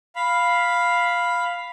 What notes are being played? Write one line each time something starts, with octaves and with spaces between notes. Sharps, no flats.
F5 B5